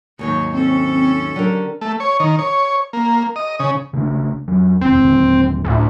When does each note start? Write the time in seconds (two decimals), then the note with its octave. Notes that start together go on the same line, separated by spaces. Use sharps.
0.19 D#2 G#2 D#3 F#3 D#4 C#5
0.54 C4 C#4 A4
1.36 D3 F#3 G4 A#4
1.81 A3
2.00 C#5
2.20 D#3
2.39 C#5
2.93 A#3
3.36 D#5
3.60 C#3
3.93 C#3 A3 D4
4.48 F2 F#3
4.81 D#1 F2 C4
5.03 D#1 G#1 D3
5.65 D2 A2